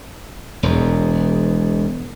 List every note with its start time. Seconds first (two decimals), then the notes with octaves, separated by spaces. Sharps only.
0.63 E1 E2